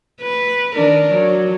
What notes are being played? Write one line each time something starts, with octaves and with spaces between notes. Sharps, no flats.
B4
D#3 D4 A#4
F#3